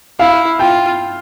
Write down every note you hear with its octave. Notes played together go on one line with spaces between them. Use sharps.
E4 F5
F4 G5